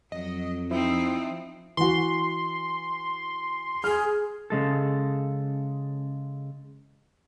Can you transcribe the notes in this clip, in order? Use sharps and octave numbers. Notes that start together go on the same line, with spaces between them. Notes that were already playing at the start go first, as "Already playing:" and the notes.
F2 F#3 D#5
F3 C4 D#4 E4
E3 F#4 C6
G#4 F6
C#3 G#3 A4